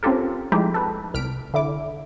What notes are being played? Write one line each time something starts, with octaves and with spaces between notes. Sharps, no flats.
C4 C#4 F4 G4 A4 A#4
F3 G#3 A3 D#4 E4 G4
A4 B4
C2 F6 B6 D7
D3 E4 D6